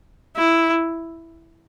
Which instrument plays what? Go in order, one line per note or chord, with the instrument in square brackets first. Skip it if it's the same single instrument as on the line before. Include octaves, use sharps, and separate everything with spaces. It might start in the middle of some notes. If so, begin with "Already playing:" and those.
[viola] E4